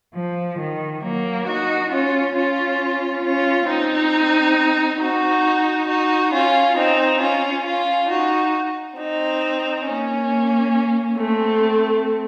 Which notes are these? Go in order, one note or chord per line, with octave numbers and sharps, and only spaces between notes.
F3
D#3
F#3 A#3
D#4 F#4
C#4 F4
C#4 F4
C#4 F4
C4 D#4
D#4 F#4
D#4 F#4
C#4 F4
C4 D#4
C#4 F4
C#4 F4
D#4 F#4
C4 D#4
A#3 C#4
A3 C4